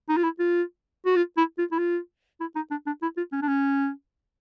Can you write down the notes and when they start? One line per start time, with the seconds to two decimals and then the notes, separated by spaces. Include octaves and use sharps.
0.09 D#4
0.17 F4
0.24 E4
0.39 F4
1.06 F#4
1.16 F4
1.37 E4
1.58 F4
1.72 E4
1.79 F4
2.40 E4
2.56 D#4
2.71 D4
2.86 D4
3.02 E4
3.17 F4
3.32 C#4
3.42 D4
3.48 C#4